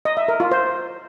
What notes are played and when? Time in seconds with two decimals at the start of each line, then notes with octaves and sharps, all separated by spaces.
0.05 D#5
0.17 E5
0.28 A#4
0.40 F4
0.51 C5